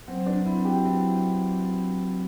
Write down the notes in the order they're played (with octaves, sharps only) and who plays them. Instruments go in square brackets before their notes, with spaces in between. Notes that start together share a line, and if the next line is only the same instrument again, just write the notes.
[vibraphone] F#3 [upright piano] C4
[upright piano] D4 [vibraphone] B4
[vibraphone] C4 [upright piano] E4
[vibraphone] F#4 [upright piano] G4
[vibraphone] F#3 [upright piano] E4